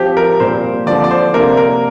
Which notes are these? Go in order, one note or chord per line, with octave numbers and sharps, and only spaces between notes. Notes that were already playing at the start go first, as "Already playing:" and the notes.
Already playing: F3 C4 G4
A#4
A#2 G3 C4 C5
D3 F3 C4 D5
D5
C5
C3 A#3 D4 A#4
A#4